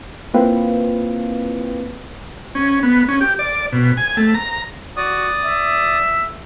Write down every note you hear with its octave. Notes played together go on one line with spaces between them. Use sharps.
A#3 C4 E4 F4 B4 F5
C#4
B3
C#4
G4
D5
B2
G#5
A3
A#5
F#4 D5 D#6
E5